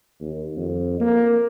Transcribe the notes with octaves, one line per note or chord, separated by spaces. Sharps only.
D#2
F2
A#3